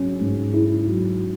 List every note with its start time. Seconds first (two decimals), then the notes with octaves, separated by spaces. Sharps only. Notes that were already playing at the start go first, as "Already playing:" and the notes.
Already playing: F#3 C#4
0.20 G#2
0.54 E4
0.87 F#3